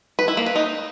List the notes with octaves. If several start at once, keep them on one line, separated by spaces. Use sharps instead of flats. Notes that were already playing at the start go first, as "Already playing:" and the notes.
B4
E4
A#3
B4
D#4